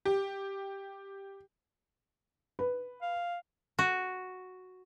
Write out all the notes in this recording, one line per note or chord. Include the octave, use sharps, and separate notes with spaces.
G4
B4
F5
F#4